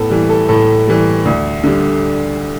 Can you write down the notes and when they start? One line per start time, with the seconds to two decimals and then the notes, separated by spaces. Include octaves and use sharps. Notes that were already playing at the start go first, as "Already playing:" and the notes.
Already playing: A2 B3 A4
0.10 E3 G3
0.29 A4
0.48 A2 A4
0.87 E3 G3
1.25 D2
1.64 D3 G3